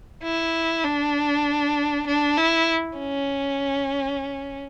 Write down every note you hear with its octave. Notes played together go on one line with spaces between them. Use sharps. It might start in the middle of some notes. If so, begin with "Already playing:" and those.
E4
D4
D4
E4
C#4